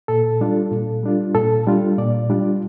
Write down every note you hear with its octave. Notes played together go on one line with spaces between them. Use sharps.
A#2 A4
G3 D4 F4
A#2
G3 D4 F4
A#2 A4
G3 D4 F4
A#2 D5
G3 D4 F4